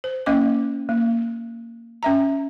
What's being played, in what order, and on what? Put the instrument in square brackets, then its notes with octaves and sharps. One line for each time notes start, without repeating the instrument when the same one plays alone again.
[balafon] C5
A#3 C#4 D#5 D6
A#3
C#4 E5 A#5